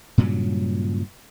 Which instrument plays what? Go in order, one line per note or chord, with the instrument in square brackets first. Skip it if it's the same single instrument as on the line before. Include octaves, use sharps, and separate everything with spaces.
[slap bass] G2 A#2 C#3 F#3